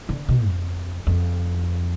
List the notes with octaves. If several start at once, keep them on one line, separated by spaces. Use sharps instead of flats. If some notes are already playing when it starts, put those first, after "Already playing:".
D3
B2
F2
F2